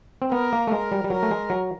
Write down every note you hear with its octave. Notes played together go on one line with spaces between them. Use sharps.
C4
B3 A#4
A#3
A3
G#3 A#4
G3
G3
F#3 A#4
A3
G#3
F#3